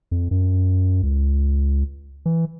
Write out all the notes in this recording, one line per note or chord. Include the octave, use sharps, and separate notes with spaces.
F2
F#2
C#2
E3